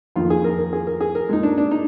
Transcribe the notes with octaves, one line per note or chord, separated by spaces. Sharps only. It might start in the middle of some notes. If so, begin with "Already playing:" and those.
F2 D#3 A#3 F4
G#4
A#4
A#4
G#4
A#4
G#4
A#4
A#2 G#3 D#4
D4
D4
D#4